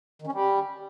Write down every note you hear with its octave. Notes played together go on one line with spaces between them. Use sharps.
D#3
C#4
G3